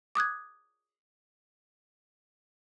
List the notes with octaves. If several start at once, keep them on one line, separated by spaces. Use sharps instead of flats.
D6 D#6 F#6 G#6